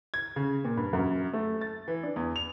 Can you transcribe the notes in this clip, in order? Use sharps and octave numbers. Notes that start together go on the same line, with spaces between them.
G#6
C#3
A#2
G2
F#2
A3
A6
E3
D4
E2
F7